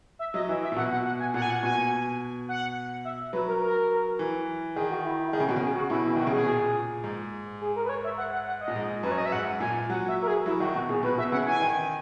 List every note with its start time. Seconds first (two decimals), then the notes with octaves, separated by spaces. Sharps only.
0.19 E5
0.34 F#3 D#5
0.49 E3 E5
0.63 E5
0.72 A#2
0.76 B2 F#5
0.92 F#5
1.05 F#5
1.20 G#5
1.34 A#2 F#5
1.42 G#5
1.50 F#5
1.62 B2 G#5
2.49 F#5
3.05 E5
3.33 F#3 B4
3.48 A#4
3.62 A#4
4.19 E3
4.76 D#3 G#4
4.90 F#4
5.05 E4
5.19 E4
5.33 D#3 G#4
5.40 C#3
5.47 B2 F#4
5.56 C#3
5.62 G#4
5.76 F#4
5.90 B2 E4
6.05 E3 E4
6.16 D#3 F#4
6.27 C#3
6.32 B2 G#4
6.47 A#2
7.04 G#2
7.61 G#4
7.76 A#4
7.85 B4
7.89 C#5
8.04 E5
8.18 F#5
8.33 F#5
8.47 F#5
8.61 D#5
8.68 A#2
8.76 G#2
9.03 F#2 B4
9.11 C#5
9.18 D#5
9.26 E5
9.32 G#2 F#5
9.60 A#2 G#5
9.90 F#3 F#5
10.08 E5
10.22 A#4
10.27 G#4
10.46 F#3 E4
10.60 D#3 F#4
10.74 B2 F#4
10.89 A#2 G#4
11.03 B2 B4
11.18 B2 E5
11.32 C#3 F#5
11.47 E3 G#5
11.61 D#3